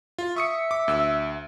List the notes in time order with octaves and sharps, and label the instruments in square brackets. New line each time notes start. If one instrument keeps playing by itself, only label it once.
[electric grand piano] F4
[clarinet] E5 [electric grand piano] C#6 D#6 C#7
[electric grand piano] D6
D2 E6